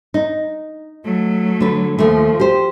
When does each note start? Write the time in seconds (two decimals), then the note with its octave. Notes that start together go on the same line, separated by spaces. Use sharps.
0.14 D#4
1.05 F#3 A3
1.61 D3 B4
1.99 D#2 F3 A3
2.40 G4 C5